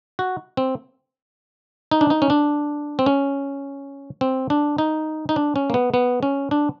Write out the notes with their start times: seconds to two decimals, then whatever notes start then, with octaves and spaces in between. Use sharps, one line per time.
0.19 F#4
0.57 C4
1.91 D#4
2.01 D4
2.10 D#4
2.22 C#4
2.30 D4
2.99 C4
3.06 C#4
4.21 C4
4.50 D4
4.78 D#4
5.29 D#4
5.36 D4
5.56 C#4
5.70 A#3
5.74 B3
5.94 B3
6.23 C#4
6.51 D4